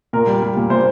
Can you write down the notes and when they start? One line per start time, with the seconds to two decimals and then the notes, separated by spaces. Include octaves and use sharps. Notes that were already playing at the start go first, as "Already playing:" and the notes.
0.13 A#2 A#4
0.27 G3
0.43 G3
0.56 A#2
0.70 A#2 C5